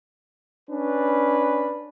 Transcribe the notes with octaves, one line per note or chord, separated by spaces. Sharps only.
C#4 D4 B4